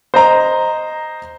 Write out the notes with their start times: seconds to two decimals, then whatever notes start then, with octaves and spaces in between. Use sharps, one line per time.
0.14 C5 D#5 A#5